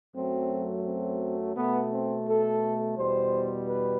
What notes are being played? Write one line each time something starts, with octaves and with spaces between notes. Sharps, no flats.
F#2 F#3 A3 C4
C4
B2 A3 B3
C4
A4
E2 B2 G3 C5
B4